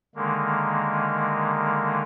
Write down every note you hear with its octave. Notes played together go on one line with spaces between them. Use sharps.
D3 D#3 G#3 A#3